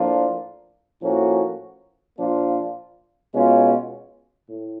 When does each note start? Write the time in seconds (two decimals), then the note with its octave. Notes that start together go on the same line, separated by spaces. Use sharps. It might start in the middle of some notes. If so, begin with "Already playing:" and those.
Already playing: A2 F3 A#3 D4 F4
1.02 A2 F3 A#3 C#4 F#4
2.18 A#2 F3 A#3 D4 F4
3.33 B2 G#3 C#4 F4
4.48 A2